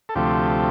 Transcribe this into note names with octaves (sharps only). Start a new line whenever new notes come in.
A4
D2 C3 F3 A3 G4